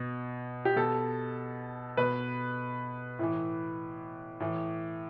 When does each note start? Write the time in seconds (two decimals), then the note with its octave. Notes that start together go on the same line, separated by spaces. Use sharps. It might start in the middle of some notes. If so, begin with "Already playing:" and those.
Already playing: B2
0.65 G4
0.76 B2 A4
1.97 B2 B4
3.19 A2 E3
4.40 A2 E3